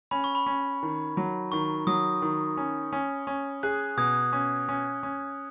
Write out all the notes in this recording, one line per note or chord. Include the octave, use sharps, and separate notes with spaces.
C#4 B5
C#6
B5
C#4
D#3
F#3
D#3 C#6
F#3 D#6
D#3
C#4
C#4
C#4
G#4 F#6
B2 D#6 G#6
C#4
C#4
C#4